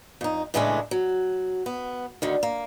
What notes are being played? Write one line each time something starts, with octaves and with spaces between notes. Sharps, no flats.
F2 D#4
A2 C#3 E3 G#3 A3 D4
F#3
B3
D2 D3 D#3
A#3